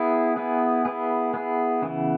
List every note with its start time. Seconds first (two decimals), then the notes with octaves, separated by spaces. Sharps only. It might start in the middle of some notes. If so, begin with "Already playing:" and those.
Already playing: B3 E4 G#4
0.36 B3 E4 G#4
0.85 B3 E4 G#4
1.34 B3 E4 G#4
1.82 C#3 E3 B3